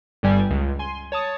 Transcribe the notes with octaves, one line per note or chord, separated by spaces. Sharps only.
G1 G2 G3 G#5
C#2
G#5 C6
C#5 A5 D#6